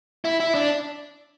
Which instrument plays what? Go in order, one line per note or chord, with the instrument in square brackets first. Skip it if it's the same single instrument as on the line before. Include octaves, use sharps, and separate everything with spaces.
[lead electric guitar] E4
E4
D4